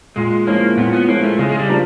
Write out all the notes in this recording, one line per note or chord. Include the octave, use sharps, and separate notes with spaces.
A#2 G#3
F3 G#3 A#3 C#4 E4
A#2 B3
B3
F3 G#3 A#3 C#4 E4
A3
C#3 G#3
G#3
G3
F3 A#3 D4